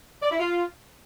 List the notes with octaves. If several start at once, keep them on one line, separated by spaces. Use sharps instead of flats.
D5
E4
F4